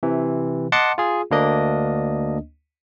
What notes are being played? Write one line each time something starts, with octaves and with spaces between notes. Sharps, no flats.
C3 E3
D#5 F#5 A5 C6 D6 C#7
F4 G#4
D2 A#3 D4 D#5